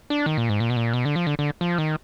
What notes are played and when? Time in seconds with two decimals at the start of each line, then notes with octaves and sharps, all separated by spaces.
0.10 D4
0.26 D#3
0.38 A#2
0.49 G#2
0.60 A#2
0.70 B2
0.76 A#2
0.93 B2
1.05 D3
1.16 F3
1.27 D3
1.39 D3
1.61 F3
1.78 D#3